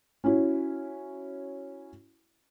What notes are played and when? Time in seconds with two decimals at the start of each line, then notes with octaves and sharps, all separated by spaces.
0.24 C#4 E4 F#4